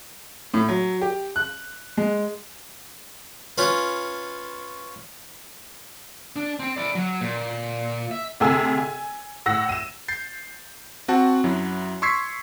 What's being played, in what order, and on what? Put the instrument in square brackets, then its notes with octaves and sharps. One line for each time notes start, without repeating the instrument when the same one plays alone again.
[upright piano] A2
F#3
G4
F#6
G#3
[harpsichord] C#4 F4 B4
[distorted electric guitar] D4
C4 G5
E4 D5
F#3
A#2
E5
[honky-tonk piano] D2 C3 G#4 A4 G#5 E6
G#5
A2 F#5 E6 A#6
D#7 E7
[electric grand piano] G6 A6 C7
C4 F#4 F#5 A5
F#2 F#3 E4
C6 C#6 E6 G#6 B6 C7